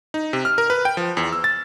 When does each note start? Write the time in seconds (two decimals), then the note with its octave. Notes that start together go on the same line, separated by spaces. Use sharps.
0.14 D#4
0.33 C3
0.45 F6
0.58 A#4
0.70 B4
0.85 G5
0.97 F3
1.17 E2
1.33 E6
1.44 A6